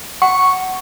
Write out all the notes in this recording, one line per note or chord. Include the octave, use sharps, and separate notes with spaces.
F#5 C#6